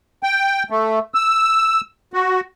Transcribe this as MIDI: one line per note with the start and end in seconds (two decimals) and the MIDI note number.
0.23 0.63 79
0.70 0.99 57
1.14 1.81 88
2.13 2.40 66